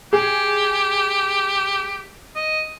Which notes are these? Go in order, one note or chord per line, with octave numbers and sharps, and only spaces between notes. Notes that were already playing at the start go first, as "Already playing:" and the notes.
G4 G#4
D#5